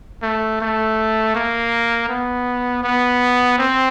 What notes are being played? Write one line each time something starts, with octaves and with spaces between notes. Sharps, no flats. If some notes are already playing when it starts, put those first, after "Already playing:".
A3
A3
A#3
B3
B3
C4